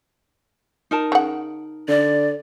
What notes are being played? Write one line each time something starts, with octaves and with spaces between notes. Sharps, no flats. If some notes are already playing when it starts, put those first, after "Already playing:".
D#4 A#4 A5
C#3 F#5
D3 D5